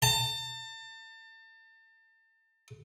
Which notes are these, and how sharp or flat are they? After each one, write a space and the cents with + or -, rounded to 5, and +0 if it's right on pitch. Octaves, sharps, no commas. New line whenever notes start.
A5 +35